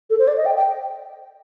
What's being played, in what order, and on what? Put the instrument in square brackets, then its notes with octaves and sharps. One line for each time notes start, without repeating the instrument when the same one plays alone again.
[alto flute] A4
C5
D5
D#5
G5
G5